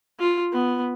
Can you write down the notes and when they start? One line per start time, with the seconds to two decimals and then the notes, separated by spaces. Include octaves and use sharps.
0.19 F4
0.53 B3